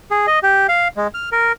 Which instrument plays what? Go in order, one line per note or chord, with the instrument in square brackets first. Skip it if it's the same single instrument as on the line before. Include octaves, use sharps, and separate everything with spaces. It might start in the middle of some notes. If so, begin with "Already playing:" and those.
[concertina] G#4
D#5
G4
F5
G#3
F6
A#4